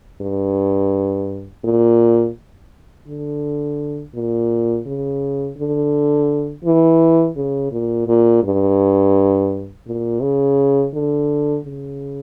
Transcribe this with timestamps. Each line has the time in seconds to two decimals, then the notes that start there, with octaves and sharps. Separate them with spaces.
0.21 G2
1.64 A#2
3.07 D3
4.15 A#2
4.87 C#3
5.57 D3
6.65 E3
7.36 C#3
7.72 A#2
8.08 A#2
8.44 G2
9.87 A#2
10.22 C#3
10.94 D3
11.65 C#3